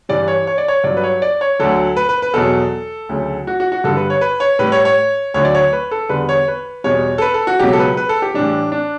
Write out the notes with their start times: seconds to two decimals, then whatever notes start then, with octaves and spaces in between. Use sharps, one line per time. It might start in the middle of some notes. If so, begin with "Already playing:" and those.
0.09 G2 E3 G3 D5
0.28 C#5
0.47 C#5
0.58 D5
0.68 C#5
0.84 G2 F#3 D5
0.97 B4
1.04 C#5
1.22 D5
1.41 C#5
1.59 D2 D3 F#3 A4
1.96 B4
2.09 B4
2.22 B4
2.34 E2 B2 F#3 A4
3.09 D2 C#3 F#3
3.47 F#4
3.60 F#4
3.72 F#4
3.84 G2 D3 G3 A4
3.97 B4
4.10 C#5
4.21 B4
4.40 C#5
4.59 A2 G3 B4
4.72 C#5
4.85 C#5
5.34 D2 D3 F#3 C#5
5.45 D5
5.55 C#5
5.73 B4
5.91 A4
6.09 E2 D3 G3 B4
6.29 C#5
6.48 B4
6.84 E2 B2 G3 C#5
7.18 A4
7.22 B4
7.34 A4
7.47 F#4
7.59 C#2 B2 F#3 G4
7.73 A4
7.79 B4
7.97 B4
8.09 A4
8.22 G4
8.34 A2 E3 G3 D4
8.72 D4